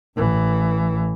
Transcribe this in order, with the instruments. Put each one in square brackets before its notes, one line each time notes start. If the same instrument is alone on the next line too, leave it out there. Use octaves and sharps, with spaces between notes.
[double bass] A1 E3